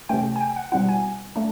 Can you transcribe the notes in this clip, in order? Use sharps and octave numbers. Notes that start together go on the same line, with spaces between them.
C3 E3 A3 C#4 G5
G#5
G5
F#5
B2 G3 C4 E4 F#5
G#5
A3 D4